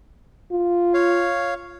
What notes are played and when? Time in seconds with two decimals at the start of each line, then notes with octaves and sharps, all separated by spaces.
0.52 F4
0.94 C#5 F5